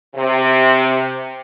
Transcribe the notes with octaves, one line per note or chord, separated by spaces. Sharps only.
C3